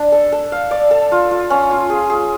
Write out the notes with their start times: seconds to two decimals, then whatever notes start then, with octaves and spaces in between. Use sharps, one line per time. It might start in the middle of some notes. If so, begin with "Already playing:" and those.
Already playing: D4
0.12 A4
0.32 A4
0.52 F5
0.71 D5
0.91 A4
1.12 F4
1.31 F4
1.50 C#4
1.71 F4
1.90 G#4
2.10 G#4